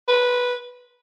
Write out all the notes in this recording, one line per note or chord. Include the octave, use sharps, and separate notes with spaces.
B4